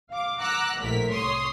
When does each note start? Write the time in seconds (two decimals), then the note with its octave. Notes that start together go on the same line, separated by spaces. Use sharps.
0.10 F5 D6
0.40 F#5 A#5 D6 E6 F#6
0.79 A#1 A2 D3 A#4 B6
1.09 C2 C#5 C6 D#6